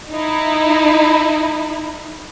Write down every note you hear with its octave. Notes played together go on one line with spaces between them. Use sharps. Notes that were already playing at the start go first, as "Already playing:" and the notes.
D#4 E4